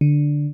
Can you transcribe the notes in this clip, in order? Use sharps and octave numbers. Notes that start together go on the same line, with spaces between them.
D3